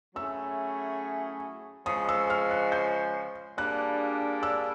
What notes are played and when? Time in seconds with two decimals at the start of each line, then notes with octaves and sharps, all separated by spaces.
0.16 F#3 A3 C#4 E4 G#4 E6
1.86 C#3 F3 G#3 D#6
2.09 E6
2.30 F6
2.51 F#6
2.72 G6
3.58 G3 A#3 D4 F4 G#4 F#6
4.43 E6